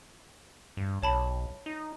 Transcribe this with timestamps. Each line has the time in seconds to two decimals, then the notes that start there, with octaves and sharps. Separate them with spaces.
0.77 G2
1.03 B1 C#5 A5 B5
1.66 D#4